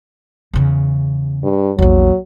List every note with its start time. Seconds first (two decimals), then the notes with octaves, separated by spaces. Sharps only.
0.53 E2 C#3
1.44 G2
1.79 A#1 E2 F#3